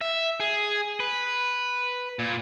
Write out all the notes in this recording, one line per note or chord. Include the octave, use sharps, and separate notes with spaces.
E5
G#4
B4
A#2